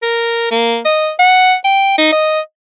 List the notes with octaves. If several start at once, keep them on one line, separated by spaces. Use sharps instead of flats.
A#4
A#3
D#5
F#5
G5
D#4
D#5